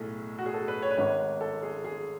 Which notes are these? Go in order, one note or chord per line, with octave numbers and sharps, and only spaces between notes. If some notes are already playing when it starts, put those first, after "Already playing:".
Already playing: B1 A2 G#4 A4
F#4
G#4
A4
B4
C#5
B4
G#1 G#2 C#5
A4
G#4
G#4